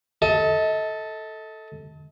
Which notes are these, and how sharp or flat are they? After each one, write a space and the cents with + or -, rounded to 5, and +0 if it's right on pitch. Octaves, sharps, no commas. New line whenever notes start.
A4 +0 D#5 +35